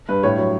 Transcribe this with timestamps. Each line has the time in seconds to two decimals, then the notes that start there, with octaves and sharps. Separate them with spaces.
0.09 G2 B4
0.23 A2 C#5
0.38 F#3